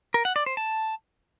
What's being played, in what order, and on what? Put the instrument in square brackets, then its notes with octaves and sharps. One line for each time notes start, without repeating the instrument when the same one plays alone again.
[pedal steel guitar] A#4
F#5
D5
C5
A5